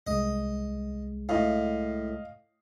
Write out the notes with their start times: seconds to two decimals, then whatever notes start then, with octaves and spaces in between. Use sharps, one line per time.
0.07 C2 G#3 D#5
1.29 A2 D#5 F5